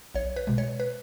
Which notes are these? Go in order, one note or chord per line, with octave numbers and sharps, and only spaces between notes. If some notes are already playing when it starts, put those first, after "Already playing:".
B1 C#5
B4
B2 G#3
C#5
B4